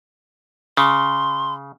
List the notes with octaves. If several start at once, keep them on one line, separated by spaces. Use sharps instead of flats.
C#3 C6